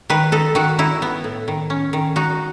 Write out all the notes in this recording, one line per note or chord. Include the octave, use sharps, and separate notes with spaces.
D#3 B4
D#4 A4
D#3 F#4
D#4 E4
B3
A2
D#3
C#4
D#3
D#4 F#4